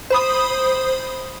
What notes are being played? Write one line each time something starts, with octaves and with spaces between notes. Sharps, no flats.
C5 B5 D#6